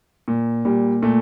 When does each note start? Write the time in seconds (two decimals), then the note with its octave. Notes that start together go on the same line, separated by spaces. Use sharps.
0.28 A#2
0.65 A#2 G3
1.02 A#2 A3